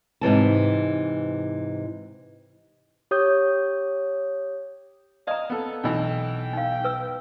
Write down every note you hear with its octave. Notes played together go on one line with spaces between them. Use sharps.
G#2 C3 E3 A5
G4 C#5 D#6 G6
D5 D#5 F5 A#5
B3 A4
B1 B2 E3 D#5 G5
D#4 F5
B4 E6